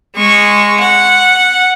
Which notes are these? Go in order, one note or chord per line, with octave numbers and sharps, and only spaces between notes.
G#3 C#6
F#5